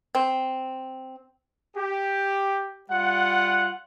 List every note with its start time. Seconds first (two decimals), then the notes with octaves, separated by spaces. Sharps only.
0.15 C4
1.76 G4
2.90 G3 F4 F#5